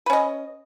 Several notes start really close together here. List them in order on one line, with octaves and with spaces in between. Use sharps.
B4 C#4 D#5